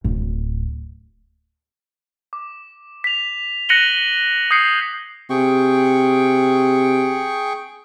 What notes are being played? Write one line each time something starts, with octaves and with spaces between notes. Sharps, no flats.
D1
D6
B6 F7
F#6 A#6 C#7 D#7 F#7 G7
D#6 G6 G#6 C7 C#7
C3 G#4 G5 C#6